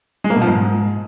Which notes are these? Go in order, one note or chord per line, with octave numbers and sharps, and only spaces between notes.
G#3
A#3
B2
F3
G#2